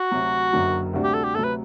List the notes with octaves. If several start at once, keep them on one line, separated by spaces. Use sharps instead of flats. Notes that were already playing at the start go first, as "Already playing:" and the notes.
Already playing: F#4
D2 C3 F#3
F#1 F#2 D3 F#3
D2 C3 G3 D4 F#4
G4
A4
G4
D2 C3 F#3 A4
B4